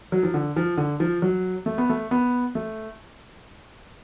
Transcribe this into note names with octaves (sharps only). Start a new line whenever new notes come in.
F#3
F3
D3
F3
D3
F3
F#3
A3
B3
A3
B3
A3